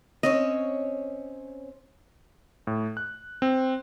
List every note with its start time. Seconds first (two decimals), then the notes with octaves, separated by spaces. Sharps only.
0.23 C4 C#4 C#5 D#5
2.67 A2
2.97 F#6
3.42 C4